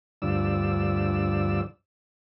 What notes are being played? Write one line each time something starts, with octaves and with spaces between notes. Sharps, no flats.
D2 G2 F3 D5 E6